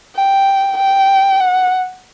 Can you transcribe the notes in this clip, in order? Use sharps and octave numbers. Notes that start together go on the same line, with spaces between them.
G5
G5
F#5